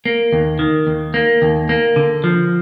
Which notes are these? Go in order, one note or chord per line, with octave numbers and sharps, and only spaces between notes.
A#3
D#2
D#3
D#2
A#3
D#2
A#3
D3
F3